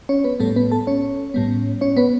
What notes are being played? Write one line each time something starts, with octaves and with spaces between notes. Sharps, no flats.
C#4 C#5
B3 B4
A2 G3 A3 B3 A4
B3 B4
A4 A5
C#4 C#5
A2 G3 B3
C#4 C#5
B3 B4